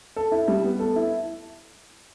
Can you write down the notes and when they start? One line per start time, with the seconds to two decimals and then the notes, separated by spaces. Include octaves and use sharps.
0.16 A4
0.32 E4
0.48 G3
0.64 B3
0.80 A4
0.96 E4